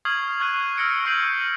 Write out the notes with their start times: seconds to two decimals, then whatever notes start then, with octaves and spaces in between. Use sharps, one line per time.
0.05 C#6 D#6 F6 G#6 C7 F#7
0.40 C#6 F6 F#6 G#6 C7 D#7
0.77 E6 F6 A#6 C#7 D7
1.05 C#6 E6 G6 C7 D7 F#7